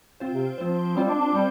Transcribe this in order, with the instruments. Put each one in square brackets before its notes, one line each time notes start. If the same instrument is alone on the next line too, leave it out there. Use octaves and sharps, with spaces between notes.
[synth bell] C4 F4 C5
[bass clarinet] C3
[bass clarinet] F3 [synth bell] C4 F4 C5
[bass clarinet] G3 [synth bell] C4 F4 C5
[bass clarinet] D4
D4
[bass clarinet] G3 [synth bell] C4